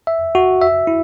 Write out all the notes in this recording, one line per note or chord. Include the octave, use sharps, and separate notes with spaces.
E5
F#4
E5
E4